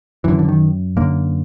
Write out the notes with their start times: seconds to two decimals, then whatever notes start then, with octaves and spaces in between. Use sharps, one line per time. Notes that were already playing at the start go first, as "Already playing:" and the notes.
0.24 F#2 D3 E3
0.39 D3
0.48 D#3
0.96 F#2 D3 A#3